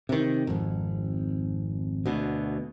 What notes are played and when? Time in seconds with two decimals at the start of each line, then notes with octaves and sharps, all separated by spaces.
0.09 C3 D#3
0.47 G#1 F2
2.06 D2 B2